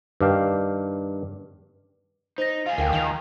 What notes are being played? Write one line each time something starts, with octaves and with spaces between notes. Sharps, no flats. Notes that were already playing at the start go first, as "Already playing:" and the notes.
G2 D#3 D4 F5 G5
D#4 C5 A#6
F4 G#4 F5
D2 A#4 F5 G5
D#3 G5 F7